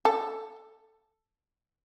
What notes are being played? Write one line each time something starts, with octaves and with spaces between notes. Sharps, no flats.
A4